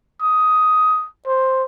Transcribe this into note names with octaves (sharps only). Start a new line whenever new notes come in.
D#6
C5